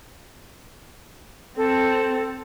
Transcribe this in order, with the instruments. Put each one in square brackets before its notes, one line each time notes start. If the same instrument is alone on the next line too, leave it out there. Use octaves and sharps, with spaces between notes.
[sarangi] C4 [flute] A4